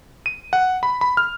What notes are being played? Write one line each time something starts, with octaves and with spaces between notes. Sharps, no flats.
D#7
F#5
B5
B5
F6